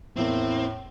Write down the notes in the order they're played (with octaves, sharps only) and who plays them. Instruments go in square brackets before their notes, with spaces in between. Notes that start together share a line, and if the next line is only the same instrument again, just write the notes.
[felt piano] E2 A#3 [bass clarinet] A2 [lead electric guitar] C4 [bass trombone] E4